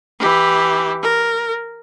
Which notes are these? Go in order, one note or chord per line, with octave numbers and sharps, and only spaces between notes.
E3 G4
A#4